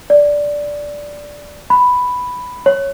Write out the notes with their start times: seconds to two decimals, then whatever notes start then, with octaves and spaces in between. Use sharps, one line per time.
0.10 D5
1.70 B5
2.66 C#5